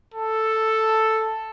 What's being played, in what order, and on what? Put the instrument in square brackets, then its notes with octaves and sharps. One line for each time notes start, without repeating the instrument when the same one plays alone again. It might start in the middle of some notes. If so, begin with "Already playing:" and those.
[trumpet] A4